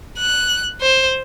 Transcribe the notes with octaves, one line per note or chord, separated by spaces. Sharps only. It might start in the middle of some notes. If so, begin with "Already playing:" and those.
F#6
C5